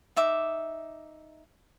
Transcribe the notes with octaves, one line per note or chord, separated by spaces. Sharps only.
D#4 E5 D6